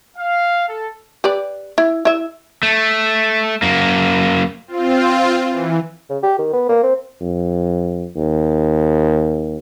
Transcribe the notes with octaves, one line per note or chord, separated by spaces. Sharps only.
F5
A4
G4 B4 D5
E4
E4 E5
A3
F#2 A#3
C4 F4
E3
C#3
G4
D#3
B3
A#3
C4
F2
D#2